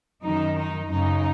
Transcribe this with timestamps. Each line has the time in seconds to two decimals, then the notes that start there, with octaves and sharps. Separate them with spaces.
0.22 F#2 D#3 D#4
0.57 D#4
0.89 F#2 C#3 D#4